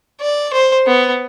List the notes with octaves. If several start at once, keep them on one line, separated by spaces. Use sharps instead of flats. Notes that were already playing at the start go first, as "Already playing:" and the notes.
D5
C5
B3